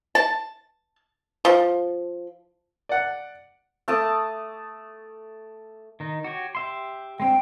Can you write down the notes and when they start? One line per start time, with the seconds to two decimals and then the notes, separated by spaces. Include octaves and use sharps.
0.15 A5
1.45 F3
2.89 D5 F#5
3.88 A3 A5 D6 D#6
6.00 D#3 D#4
6.24 F#4 G4 C#5
6.55 G4 E5 C6
7.20 G#3 C4 D4 G5